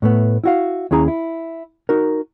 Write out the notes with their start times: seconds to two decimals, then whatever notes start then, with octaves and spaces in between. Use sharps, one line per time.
0.02 A2 A3 B3
0.44 E4 F#4 F5
0.91 D#2 C#4 E4 G#4 A#5
1.08 E4
1.89 D#4 F#4 A#4